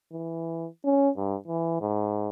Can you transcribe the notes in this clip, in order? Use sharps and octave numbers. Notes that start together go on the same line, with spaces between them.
E3
C#4
G2
E3
G#2